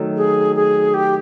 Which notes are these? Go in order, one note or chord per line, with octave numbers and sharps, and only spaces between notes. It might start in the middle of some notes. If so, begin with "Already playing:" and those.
Already playing: D#3 F#3 A3
G#4
G#4
G4